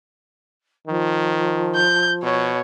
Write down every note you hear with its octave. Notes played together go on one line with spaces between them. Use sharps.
D#3 F3
G6
B2 C#5